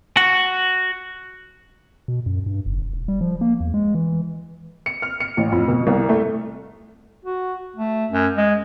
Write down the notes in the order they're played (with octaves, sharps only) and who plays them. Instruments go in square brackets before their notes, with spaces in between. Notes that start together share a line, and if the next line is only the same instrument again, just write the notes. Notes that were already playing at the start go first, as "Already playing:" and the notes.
[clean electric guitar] F#4
[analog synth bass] B2
F#2
G2
F#1
F1
E1
G3
F3
A#3
E2
G#3
E3
[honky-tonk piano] C#7
F6
C#7
A1
F2
B2
C2
A3
[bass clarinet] F#4
A3
F#2
G#3